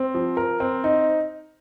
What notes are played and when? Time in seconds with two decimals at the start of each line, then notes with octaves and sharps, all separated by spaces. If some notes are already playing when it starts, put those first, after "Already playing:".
Already playing: C4
0.14 F3
0.37 A#4
0.60 C4
0.84 D#4